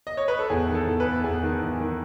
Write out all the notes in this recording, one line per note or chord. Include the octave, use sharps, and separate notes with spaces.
D#5
C#5
B4
A4
E2 G#4
D#3
A4
E2
B4
E2
E2 G#4
D#3
E2
D#3